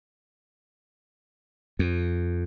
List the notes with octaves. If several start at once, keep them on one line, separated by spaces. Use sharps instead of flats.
F2